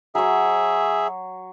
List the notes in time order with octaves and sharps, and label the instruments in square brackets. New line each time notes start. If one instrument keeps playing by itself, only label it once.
[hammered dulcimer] F#3 C#5 [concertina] G#4 E5